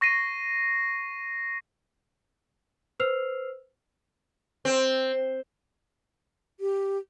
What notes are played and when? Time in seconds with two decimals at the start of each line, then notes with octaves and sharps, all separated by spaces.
0.01 C#6 A#6 C7 D#7
3.00 B4 C5 E6 F6 C7 F7
4.65 C4
6.60 G4